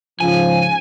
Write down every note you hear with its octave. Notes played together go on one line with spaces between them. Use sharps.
G#2 C#3 F3 G#5